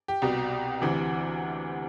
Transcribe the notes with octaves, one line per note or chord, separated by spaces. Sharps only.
G4
C2 B2
D2 C3 E3